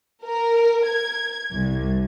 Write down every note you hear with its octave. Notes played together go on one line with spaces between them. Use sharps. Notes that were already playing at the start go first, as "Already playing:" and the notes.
A#4
G#6
C2